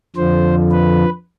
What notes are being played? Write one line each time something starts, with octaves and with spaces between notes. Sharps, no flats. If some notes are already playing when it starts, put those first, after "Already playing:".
F2 D3 F3 C5
B4